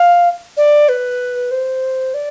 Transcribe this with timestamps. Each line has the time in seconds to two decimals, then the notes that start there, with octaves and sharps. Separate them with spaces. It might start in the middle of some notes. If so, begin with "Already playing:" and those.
Already playing: F5
0.57 D5
0.89 B4
1.51 C5
2.14 D5